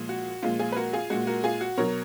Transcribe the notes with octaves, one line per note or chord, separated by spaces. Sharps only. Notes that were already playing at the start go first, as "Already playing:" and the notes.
Already playing: A#2 F3 G#3
F#4
A#2 F3 G#3 F4
F4 G#4
B4
F#4 A#4
F4 G#4
A#2 G#3 F#4
F#4 A#4
F4 G#4
F#4
B2 F#3 A#4 C#5